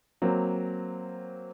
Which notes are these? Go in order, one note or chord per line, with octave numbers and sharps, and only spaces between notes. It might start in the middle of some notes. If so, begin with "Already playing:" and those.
F#3 A#3 C4